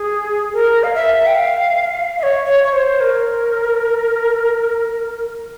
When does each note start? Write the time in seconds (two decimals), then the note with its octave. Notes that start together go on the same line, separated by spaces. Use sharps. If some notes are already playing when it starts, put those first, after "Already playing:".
Already playing: G#4
0.53 A#4
0.83 F5
0.95 E5
1.27 G5
1.35 F5
2.18 E5
2.23 C#5
2.45 C#5
2.64 C#5
2.73 C5
3.01 A#4